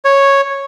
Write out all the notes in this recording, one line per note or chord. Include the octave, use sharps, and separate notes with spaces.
C#5